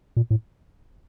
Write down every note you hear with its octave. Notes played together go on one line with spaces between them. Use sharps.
A#2
A2